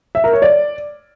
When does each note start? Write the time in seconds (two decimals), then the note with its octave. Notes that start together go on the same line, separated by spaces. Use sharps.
0.15 E5
0.24 A#4
0.33 C#5
0.42 D5